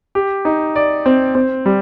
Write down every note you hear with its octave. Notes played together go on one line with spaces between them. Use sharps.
G4
D#4
D5
C4
C4
G3